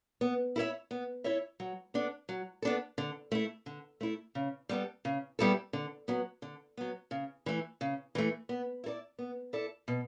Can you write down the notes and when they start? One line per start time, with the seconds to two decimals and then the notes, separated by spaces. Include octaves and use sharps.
0.21 B3
0.56 E4 A4 C#5 E5
0.91 B3
1.24 E4 A4 C#5 E5
1.60 F#3
1.94 B3 D4 A4
2.29 F#3
2.62 B3 D4 A4
2.98 D3
3.32 A3 E4
3.66 D3
4.01 A3 E4
4.35 C#3
4.69 G3 B3 E4 A4
5.05 C#3
5.39 G3 B3 E4 A4
5.73 D3
6.08 F#3 B3
6.42 D3
6.77 F#3 B3
7.11 C#3
7.46 E3 A3
7.81 C#3
8.15 E3 A3
8.49 B3
8.84 E4 A4 D5
9.19 B3
9.53 E4 A4 D5
9.88 B2